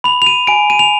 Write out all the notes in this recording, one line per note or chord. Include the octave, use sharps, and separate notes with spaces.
B5 F7
F7
D#7
G#5 D7
D#7
F7